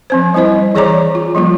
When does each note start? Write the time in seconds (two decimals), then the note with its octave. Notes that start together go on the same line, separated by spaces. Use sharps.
0.10 F3 C4 C5
0.34 G3 C4 E4 C5 D#5
0.75 E3 G#4 C#5 D5 A#5 D6
1.15 F4
1.35 F3 G3 A#3 F4